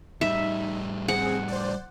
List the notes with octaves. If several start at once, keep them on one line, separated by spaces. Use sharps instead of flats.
A2 G3 D#4 E5
C4 G#4 F#5
C5 D5